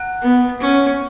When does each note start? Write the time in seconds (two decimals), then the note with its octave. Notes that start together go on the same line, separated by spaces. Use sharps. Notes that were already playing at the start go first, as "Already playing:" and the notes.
Already playing: F#5 F#6
0.22 B3
0.60 C#4